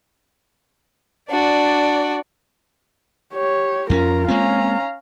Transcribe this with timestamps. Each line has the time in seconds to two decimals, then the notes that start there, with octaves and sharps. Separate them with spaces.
1.30 D4 F#4 D5
3.34 G4 C#5
3.90 F2 A#3 C#4 F4 A#4 A#5
4.28 G#3 A#3 C4 C#4 F5 A#5